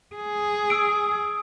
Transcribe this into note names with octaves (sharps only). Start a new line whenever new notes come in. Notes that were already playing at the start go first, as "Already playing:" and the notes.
G#4
D#6 E6 D7